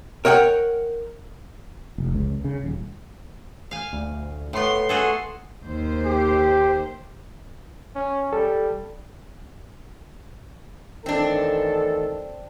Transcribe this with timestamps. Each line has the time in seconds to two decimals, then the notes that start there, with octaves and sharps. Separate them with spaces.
0.25 A#4 C#5 D#5 F#5 G5
1.98 F1
2.15 C#2
2.45 C#3
2.64 D#1
3.71 F5 G#5
3.93 D2
4.53 A2 A3 B3 C6 C7
4.89 F#4 G#4 A4
5.62 D#2 C5
6.05 G4
7.95 C#4
8.33 G3 A4
11.06 A1 D#3 C4 D4 A4